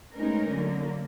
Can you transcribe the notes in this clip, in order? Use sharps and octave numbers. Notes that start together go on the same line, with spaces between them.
G#3 A3 B3 C#4 D#4 A#4
D3 F#3 A#3